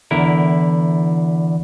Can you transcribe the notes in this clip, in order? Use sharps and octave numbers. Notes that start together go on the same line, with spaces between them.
E2 D3 E4 A#4